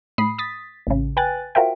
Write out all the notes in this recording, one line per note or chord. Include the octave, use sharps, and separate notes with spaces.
A2 B5 D#6 C7
D#6 A6 B6
A1 C#3
B4 G5 G#5 F#6 A6
F4 F#4 A#4 C5 E5 G5